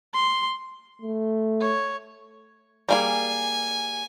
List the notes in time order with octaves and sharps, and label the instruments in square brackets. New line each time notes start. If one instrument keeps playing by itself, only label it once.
[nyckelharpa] C6
[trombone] A3
[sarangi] C#5
[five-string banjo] G3 A#3 G#4 [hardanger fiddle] G#5